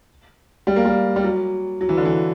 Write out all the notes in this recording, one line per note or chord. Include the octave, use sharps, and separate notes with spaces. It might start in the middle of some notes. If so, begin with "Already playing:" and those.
G3
A#3
G3
G3
F#3
F#3
E3
D3
E3